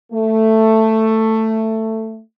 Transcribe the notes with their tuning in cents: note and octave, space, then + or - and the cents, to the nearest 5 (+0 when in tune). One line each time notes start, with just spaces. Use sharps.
A3 +10